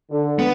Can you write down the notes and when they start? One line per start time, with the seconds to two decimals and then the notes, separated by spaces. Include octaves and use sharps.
0.11 D3
0.39 B3